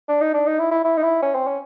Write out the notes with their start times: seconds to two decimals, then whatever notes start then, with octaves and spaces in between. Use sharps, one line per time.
0.08 D4
0.21 D#4
0.34 D4
0.46 D#4
0.59 E4
0.71 E4
0.84 E4
0.97 D#4
1.03 E4
1.22 C#4
1.35 C4
1.47 C#4